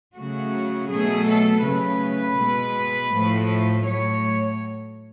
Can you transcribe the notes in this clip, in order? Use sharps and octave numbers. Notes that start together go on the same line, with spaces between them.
C#3 F#3 A3 F#4
B2 F#3 A3 G#4
A4
C#3 F#3 A3 B4
B2 G#3
A2 F3 A3
A2 F#3 A3 C#5